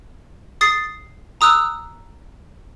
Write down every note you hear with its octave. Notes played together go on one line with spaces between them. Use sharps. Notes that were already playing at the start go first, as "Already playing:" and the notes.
D#6 A6 C7
A#5 D#6 E6 F#6